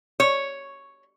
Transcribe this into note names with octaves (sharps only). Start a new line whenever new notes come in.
C#5